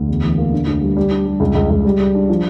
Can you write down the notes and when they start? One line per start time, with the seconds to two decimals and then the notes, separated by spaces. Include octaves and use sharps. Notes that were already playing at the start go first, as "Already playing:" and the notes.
Already playing: D2
0.08 E2
0.24 E3
0.38 A#3
0.53 D3
0.67 D2
0.81 G3
0.97 G3
1.11 D4
1.26 G3
1.40 C#2
1.55 C#2
1.70 C#2
1.85 G3
2.00 G3
2.14 D4
2.29 F3